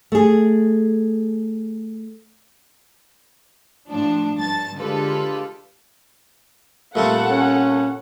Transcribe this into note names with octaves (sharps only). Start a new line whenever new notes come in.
A3 G#4
A2 F3 D4
G2 A5 A6
D3 G#3 F4 G4 A4 B4
A#2 G3 A3 C4 A4 F#5
C#4